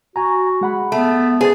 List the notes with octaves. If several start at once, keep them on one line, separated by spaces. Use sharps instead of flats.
F#4 G#5 A#5
G#3 F#5 B5
A3 B3
G#4 B4 C5 A6